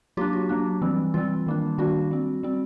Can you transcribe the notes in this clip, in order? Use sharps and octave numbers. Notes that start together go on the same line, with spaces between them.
F#3 A#3 D4 F4 G4
F#4
F#3 A#3 D4
E3 G3 C4
E3 G3 C4 F4
D#3 G3 A#3 D4
D#3 G3 A#3 D4 F#4
G3 C4
G3 C4